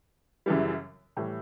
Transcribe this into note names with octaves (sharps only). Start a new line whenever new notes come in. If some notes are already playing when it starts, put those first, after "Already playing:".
F#2 C#3 E3 G3
A2 E3 G3